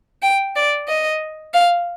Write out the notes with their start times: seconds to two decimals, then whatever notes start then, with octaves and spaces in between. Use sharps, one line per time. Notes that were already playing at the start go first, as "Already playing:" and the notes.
0.22 G5
0.56 D5
0.88 D#5
1.54 F5